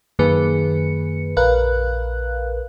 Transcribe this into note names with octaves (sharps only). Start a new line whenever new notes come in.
F#2 D#3 A#3 G#4 B4 C#7
A#1 A#4 B4 F5 F#6